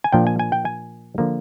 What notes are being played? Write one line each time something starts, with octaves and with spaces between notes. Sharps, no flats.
G#5
A#2 F3 A#3 D4 G5
G#5
G#5
G5
G#5
D3 F3 A#3